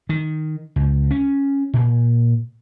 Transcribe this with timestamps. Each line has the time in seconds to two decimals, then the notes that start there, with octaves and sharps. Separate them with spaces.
0.09 D#3
0.76 C#2
1.11 C#4
1.74 A#2